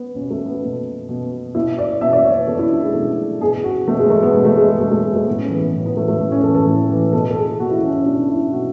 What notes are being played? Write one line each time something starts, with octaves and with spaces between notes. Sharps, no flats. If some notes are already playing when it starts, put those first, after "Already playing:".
Already playing: B3
B2 C#4
A3
B3
B2
B2
B2 E4
D5
B2 E5
D5
C#5
B4
B2 A4
E4
D4
G#3
B2 A3
B2 G#4
F#4
B2 A3
G#3
A3
B3
B2 A3
A3
G#3
G#3
B2 A3
A3
G#3
A3
A2 B3
C#4
E3 B3
B3
A2 C#4
B3
E3 A3
A3
A2
C#4
E3 A4
A4
A2
E3
B2 A4
A4
G#4
B2 F#4
E4
C#4
C#4
B2 D4
E4
B2 F#4